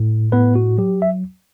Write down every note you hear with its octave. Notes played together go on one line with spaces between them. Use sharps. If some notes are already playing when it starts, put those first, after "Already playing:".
Already playing: A2
A2 B3 B4
F#4
F#3 G4
E5